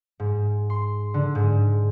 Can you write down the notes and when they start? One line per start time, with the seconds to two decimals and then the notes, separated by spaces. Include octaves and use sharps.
0.20 G#2
0.70 C6
1.14 D3
1.35 G#2